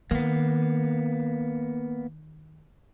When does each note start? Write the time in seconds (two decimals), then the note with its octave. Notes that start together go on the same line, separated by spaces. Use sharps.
0.11 D#3 A#3 B3